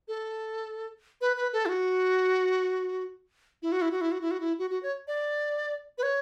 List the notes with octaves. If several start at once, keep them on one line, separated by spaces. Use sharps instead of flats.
A4
B4
B4
A4
E4
F#4
E4
F#4
E4
F#4
E4
F#4
E4
F#4
E4
F#4
F#4
C#5
D5
B4
C#5